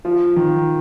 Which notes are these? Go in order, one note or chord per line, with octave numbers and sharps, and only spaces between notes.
F3
D#3